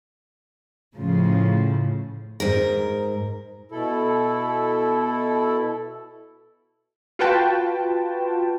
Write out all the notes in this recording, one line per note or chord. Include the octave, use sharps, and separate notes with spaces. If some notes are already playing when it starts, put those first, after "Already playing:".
A2 C#3 F3
G#2 A#4
B2 E4 A4
F4 F#4 B4 G5 A5